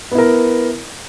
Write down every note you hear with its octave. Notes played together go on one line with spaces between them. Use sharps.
B3 E4 A#4